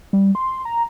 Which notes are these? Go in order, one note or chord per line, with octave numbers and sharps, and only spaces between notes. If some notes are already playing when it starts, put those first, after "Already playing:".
G3
C6
A#5